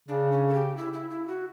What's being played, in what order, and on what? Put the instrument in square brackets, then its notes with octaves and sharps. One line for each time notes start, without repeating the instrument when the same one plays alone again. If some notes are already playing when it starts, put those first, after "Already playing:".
[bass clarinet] C#3 [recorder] D4
[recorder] C#4
A4
G4
E4
E4
E4
F#4